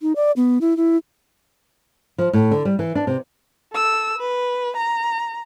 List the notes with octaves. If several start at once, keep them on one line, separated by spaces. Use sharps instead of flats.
D#4
D5
B3
E4
E4
F3
A2
D3
G3
E3
D4
C3
A4 E6
B4
A#5